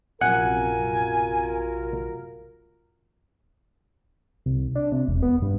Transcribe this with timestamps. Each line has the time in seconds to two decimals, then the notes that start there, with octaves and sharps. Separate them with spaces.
0.21 A#1 F#2 C3 F4 F#4 A#4 F#5 G#5
4.46 C2
4.75 D4
4.92 C3
5.07 E1
5.23 B3
5.42 G2